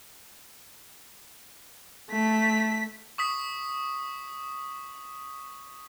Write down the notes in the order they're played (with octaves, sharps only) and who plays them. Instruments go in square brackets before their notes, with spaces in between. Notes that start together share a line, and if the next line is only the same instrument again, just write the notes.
[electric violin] A3 B6
[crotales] C#6 D#6 B6